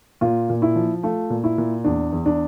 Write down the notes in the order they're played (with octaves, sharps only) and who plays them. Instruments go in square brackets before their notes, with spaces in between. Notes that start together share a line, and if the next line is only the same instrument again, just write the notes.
[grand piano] A#2 [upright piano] F4
[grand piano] A#2
[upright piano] E4
[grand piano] F3
[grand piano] A3 [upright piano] F4
[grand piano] A#2
[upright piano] E4
[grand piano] A#2
[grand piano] E2 [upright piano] D4
[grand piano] E2
[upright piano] D4